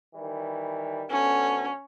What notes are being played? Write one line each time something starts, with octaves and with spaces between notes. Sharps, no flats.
D#3 E3 G3
D2 B3 C#4 A4